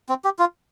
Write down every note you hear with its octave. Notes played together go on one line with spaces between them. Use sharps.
C4
G4
F4